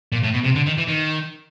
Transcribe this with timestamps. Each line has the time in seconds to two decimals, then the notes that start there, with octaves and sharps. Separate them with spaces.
0.12 A#2
0.23 A2
0.34 B2
0.44 C3
0.55 D3
0.66 D#3
0.77 E3
0.88 D#3